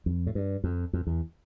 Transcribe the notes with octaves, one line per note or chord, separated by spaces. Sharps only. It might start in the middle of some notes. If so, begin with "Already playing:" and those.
F2
A2
G2
F2
F2
E2